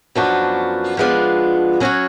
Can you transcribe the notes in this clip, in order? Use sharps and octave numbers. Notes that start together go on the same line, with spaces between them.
F#2 F3 B3 D4 F#4
F3 G#3 B3 D4 F4
F#3 C#4 F#4 C#5